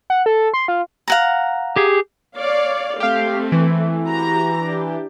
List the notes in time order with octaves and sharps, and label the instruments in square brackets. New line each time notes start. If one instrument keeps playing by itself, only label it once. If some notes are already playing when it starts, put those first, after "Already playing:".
[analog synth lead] F#5
A4
C6
F4
[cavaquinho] F5 F#5 A#5
[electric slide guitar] G4 G#4
[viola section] C#5 D5 F5
[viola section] A3 C4 [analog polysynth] G4 F5
[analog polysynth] E3
[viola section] F#4 G4 A#5
D4 G4